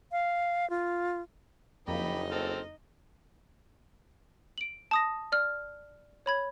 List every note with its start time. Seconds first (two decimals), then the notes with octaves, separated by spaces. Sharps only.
0.12 F5
0.70 F4
1.88 F#1 F2 A#3 D#4 G4 D#5 B5
2.31 C4 A4 F6
4.58 D7 F#7
4.91 A5 D#6 A#6
5.32 D5 F6
6.26 C#5 B5 G#6